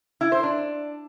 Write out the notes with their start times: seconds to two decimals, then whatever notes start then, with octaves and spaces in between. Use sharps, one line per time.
0.21 E4
0.32 C5
0.43 D4